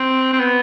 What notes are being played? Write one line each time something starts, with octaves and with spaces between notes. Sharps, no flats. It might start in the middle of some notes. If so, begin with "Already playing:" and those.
Already playing: C4
C4
B3